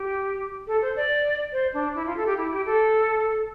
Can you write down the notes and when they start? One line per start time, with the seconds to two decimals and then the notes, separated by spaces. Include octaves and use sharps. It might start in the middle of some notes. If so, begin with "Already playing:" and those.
Already playing: G4
0.67 A4
0.82 C5
0.96 D5
1.52 C5
1.74 D4
1.95 E4
2.06 F4
2.17 A4
2.26 G4
2.37 E4
2.52 G4
2.66 A4